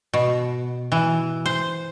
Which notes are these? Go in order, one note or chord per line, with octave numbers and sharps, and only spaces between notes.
B2
E3
C5